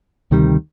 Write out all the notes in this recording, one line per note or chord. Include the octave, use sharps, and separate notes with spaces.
D2 C3 D#3 G3